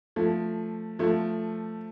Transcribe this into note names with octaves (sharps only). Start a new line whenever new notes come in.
F3 A3
F3 A3